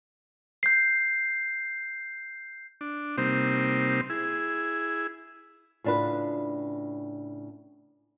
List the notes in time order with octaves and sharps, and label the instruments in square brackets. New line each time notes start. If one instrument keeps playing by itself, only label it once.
[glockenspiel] G6 C7
[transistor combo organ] D4
C3 G3 A#3 C4 D#4 C5
E4 G#4
[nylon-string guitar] A2 C#3 D4 F4 B4